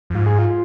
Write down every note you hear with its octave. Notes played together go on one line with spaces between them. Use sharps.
F2
G#2 F4
G#4
F4